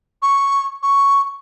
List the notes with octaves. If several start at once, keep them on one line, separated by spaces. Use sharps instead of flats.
C#6
C#6